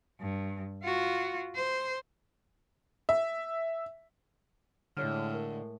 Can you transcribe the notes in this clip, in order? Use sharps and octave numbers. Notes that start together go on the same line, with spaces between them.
G2
F4 F#4
C5
E5
A2 D3 G#3 C#5 F6
A#4